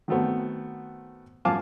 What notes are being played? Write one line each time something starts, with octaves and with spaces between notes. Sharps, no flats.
D#3 F#3 A3 B3 C4
F#2 F3 F5 G#5 A5 D6